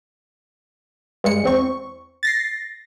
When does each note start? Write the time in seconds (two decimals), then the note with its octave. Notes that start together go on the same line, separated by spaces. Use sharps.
1.24 G2 G#3 C#7
1.44 E2 C4 C#6
2.23 A6 A#6 C7